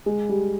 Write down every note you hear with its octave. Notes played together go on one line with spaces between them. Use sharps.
G#3
G3